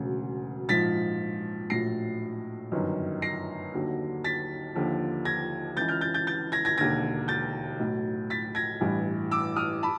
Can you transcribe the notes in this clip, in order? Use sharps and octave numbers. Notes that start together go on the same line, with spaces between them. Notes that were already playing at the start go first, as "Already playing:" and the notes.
Already playing: E1 D2 C#3 F#3
A#1 G#2 F3 A6 B6
A#1 A2 F#3 A#6 C7
G1 F#2 D#3
A#6 C7
D#2 D3 F#3
A6 B6
D#2 D3 F3
G#6 A#6
C#2 C#3 E3 G6 A6
F6 G6
G6 A6
G6 A6
G6 A6
G#6 A#6
G#6 A#6
E1 D#2 D3 G#6 A#6
G6 A6
B1 A2 F#3
A6 B6
G#6 A#6
A1 G2 E3
D6 E6
D#6 F6
A5 B5